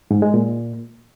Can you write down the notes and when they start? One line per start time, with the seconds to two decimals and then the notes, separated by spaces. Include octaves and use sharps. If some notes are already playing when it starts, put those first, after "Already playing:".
0.11 G#2
0.22 G#3
0.34 A#2